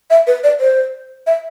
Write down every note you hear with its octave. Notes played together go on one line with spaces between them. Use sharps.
E5
B4
D5
C5
E5